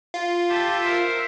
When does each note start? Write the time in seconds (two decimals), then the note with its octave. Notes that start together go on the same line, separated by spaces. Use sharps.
0.14 F4
0.49 G4 A4 E5
0.84 A#4 C5 E5